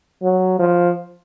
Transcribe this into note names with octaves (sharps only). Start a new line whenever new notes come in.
F#3
F3